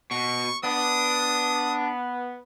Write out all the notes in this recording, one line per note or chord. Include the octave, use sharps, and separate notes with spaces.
B2 C#6
B3 D4 D#6